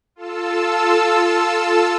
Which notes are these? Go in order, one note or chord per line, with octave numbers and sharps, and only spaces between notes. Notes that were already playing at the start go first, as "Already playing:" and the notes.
F4 A4 A5 E6